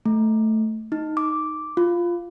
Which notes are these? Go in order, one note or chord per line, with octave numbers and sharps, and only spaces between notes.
A3
D#4
D6
F4